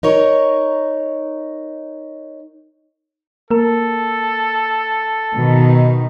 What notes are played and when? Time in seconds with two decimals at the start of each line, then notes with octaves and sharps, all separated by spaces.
0.03 D#4 A#4 C#5
3.51 A#3 A4 A#4
5.34 B2 D#3 D#4